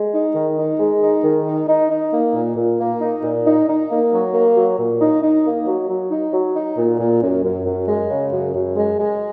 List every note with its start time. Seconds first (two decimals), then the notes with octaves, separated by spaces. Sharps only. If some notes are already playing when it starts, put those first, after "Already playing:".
Already playing: G#3
0.13 D#4
0.35 D#3
0.57 D#4
0.80 G#3
1.02 D#4
1.24 D#3
1.46 D#4
1.68 D#4
1.90 D#4
2.12 A#3
2.34 A#2
2.56 A#2
2.79 A#3
3.01 D#4
3.23 A#2
3.45 D#4
3.68 D#4
3.90 A#3
4.12 F#3
4.34 A#3
4.56 F#3
4.78 A#2
5.00 D#4
5.23 D#4
5.45 A#3
5.67 F#3
5.88 F#3
6.10 D#4
6.32 F#3
6.55 D#4
6.77 A#2
6.99 A#2
7.22 F#2
7.43 F#2
7.66 F#2
7.88 G#3
8.10 C#3
8.32 F#2
8.55 F#2
8.76 G#3
8.99 G#3